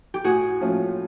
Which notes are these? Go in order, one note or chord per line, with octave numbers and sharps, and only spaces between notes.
G4
A2 F#4 G#4
F3 A3 C#4 F4